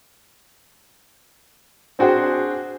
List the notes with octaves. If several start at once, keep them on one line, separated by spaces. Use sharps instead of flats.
C4 D4 F#4 G#4 C5 G5